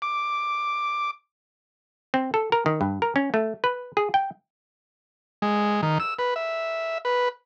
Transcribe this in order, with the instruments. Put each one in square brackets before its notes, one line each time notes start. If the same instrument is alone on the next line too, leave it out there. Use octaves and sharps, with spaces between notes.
[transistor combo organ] D6
[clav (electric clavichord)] C4
A4
A#4
D#3
G2
A#4
C#4
A3
B4
G#4
G5
[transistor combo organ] G#3
D#3
E6
B4
E5
B4